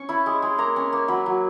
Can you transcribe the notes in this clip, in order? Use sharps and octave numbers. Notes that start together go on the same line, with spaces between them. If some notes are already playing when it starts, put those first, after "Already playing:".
Already playing: C#4 C#6
E4 B5
G#3
G#3
A#3 A#5
C#4
A#3
F#3 B5
F#3